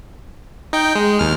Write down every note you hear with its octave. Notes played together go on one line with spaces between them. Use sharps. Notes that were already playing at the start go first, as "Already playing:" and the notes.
D#4 G5
G#3
D#2 F6